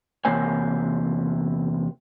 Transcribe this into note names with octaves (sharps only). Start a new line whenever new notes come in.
E2 C3 A#3 C5 C#5 G#5